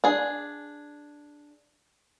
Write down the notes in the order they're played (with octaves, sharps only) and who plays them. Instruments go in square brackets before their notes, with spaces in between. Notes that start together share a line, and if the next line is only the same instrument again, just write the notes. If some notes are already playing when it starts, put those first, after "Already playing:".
[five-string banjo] D4 G#4